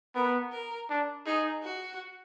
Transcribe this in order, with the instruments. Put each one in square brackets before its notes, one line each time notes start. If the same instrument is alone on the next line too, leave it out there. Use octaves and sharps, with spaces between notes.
[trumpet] B3 [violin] A#4
[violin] A#4
[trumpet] D4
[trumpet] D#4 [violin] G#4
[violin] F#4